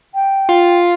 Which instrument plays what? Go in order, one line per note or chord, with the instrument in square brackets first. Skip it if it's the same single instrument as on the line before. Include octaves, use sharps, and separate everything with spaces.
[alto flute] G5
[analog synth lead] F4